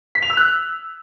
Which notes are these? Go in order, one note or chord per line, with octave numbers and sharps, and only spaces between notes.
B6
F7
E6
F#6